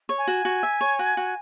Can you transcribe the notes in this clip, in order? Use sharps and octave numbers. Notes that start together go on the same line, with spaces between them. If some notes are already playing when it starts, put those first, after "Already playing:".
C#5
G#5
F#4
F#4
E5
C#5
F#4
F#4